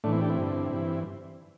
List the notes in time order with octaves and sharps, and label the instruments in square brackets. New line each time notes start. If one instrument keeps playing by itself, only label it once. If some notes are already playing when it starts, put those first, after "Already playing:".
[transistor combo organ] A2 E3 A3 D4
C4 E4
D4 G4
C4 E4
G2 D3
G2 E3